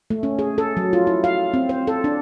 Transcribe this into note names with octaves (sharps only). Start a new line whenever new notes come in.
A3
C#4
G#4
A4
F#3
F4
E4
F5
C4
C5
A4
D4